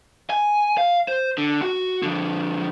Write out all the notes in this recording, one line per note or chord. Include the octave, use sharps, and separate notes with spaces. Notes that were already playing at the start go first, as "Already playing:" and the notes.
G#5
F5
C5
D3
F#4
D3 F3